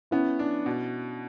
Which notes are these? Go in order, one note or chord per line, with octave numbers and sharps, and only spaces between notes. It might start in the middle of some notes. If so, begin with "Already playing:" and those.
B3 C#4 E4
D4
B2